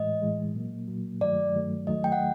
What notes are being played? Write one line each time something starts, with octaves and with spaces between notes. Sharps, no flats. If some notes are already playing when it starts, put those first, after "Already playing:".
Already playing: A2 E3 G#3 D#5
A2 E3 G#3
A#2 F#3 A#3
A#2 F#3 A#3
G2 D#3 F#3 A3 D5
G2 D#3 F#3 A3
D#2 D#3 F#3 A3 D#5
G5
F#5